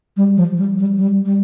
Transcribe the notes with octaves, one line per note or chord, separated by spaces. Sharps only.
G3
F3
G3
G3
G3
G3